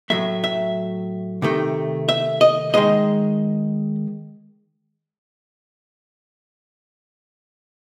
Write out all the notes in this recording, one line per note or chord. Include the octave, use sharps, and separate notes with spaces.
A2 F#3 A3 E5
E5
C3 D#3 A3
E5
D#5
D#3 G#3 D#5